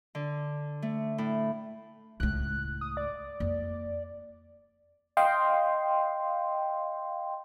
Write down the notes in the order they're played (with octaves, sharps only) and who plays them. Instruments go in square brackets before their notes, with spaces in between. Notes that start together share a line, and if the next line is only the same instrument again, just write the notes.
[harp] D3
A3
A2
[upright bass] C#2 A2 [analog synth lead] F#6
[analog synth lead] D#6
D5
[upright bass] F2 A#3
[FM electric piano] D#5 F5 G5 C6